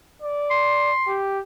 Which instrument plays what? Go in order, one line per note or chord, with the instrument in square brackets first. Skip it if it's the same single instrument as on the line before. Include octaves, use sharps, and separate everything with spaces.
[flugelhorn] D5
[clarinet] C6
[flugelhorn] G4